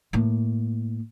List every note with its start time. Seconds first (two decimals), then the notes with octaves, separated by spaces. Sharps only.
0.13 A2 A#3